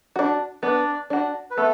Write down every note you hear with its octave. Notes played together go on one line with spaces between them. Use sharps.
D4 F#4
B3 D4 D5
D4 F#4
B4
A3 B3 A4